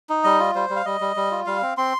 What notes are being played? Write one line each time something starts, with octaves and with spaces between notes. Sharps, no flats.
D#4
G3 D#5
F4
G3 C5
G3
F5
G3 D#5
G3
G3
F4
G3 F5
C4
C4 C6